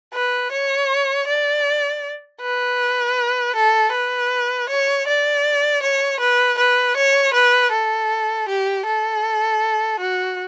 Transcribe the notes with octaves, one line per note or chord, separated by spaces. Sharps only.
B4
C#5
D5
B4
A4
B4
C#5
D5
C#5
B4
B4
C#5
B4
A4
G4
A4
F#4